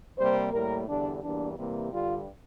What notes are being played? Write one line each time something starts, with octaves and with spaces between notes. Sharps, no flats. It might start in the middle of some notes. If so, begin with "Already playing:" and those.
C3 G3 A#3 C5
A2 G3 A#3 A#4
E2 D3 G3 D4
E2 E3 G3 A#3 D4
C3 E3 G3 A#3
G2 D3 G3 F4